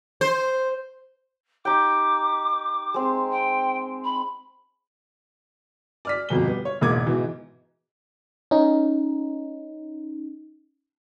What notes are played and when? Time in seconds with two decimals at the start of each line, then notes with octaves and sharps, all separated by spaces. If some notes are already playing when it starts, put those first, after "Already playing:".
0.21 C5
1.65 D#4 G4 G5 D6
2.94 G#3 C4
3.31 G5
4.05 B5
6.05 D5 F6 B6
6.29 G1 F2 B2 G7
6.44 G3 B3
6.65 C#5
6.81 E1 A1 G#2 A#3 D6 G#6
7.06 G#2 B2 E3
8.51 C#4 D#4